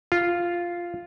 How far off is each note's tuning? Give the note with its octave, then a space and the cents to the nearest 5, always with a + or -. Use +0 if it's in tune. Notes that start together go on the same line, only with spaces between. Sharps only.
F4 -5